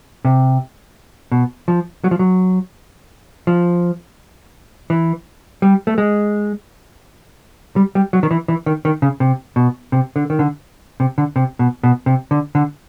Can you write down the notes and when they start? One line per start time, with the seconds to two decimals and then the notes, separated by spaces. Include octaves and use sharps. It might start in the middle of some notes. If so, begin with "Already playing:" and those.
0.25 C3
1.32 B2
1.68 F3
2.04 F#3
2.11 F3
2.19 F#3
3.47 F3
4.90 E3
5.62 G3
5.87 A3
5.98 G#3
7.76 G3
7.95 G3
8.13 F#3
8.23 D#3
8.31 E3
8.48 E3
8.66 D#3
8.85 D#3
9.02 C#3
9.20 C3
9.56 B2
9.92 C3
10.16 D3
10.30 D#3
10.39 D3
11.00 C3
11.18 D3
11.36 C3
11.59 B2
11.83 B2
12.06 C3
12.31 D3
12.55 D3